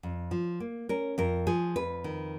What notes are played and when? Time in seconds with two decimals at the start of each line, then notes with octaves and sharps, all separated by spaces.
0.03 F2
0.31 F3
0.60 A#3
0.89 C#4 A#4
1.18 F2 A#4
1.47 F3 G#4
1.76 F2 B4
2.04 D#3